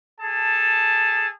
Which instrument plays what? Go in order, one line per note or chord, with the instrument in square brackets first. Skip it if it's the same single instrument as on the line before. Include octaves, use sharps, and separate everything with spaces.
[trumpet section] G#4 A4 A5